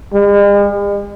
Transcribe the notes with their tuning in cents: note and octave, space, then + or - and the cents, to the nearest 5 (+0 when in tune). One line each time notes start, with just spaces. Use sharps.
G#3 -45